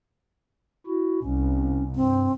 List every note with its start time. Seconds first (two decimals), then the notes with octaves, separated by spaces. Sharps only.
0.87 E4 F#4
1.23 C2 C#4
1.96 G2 C4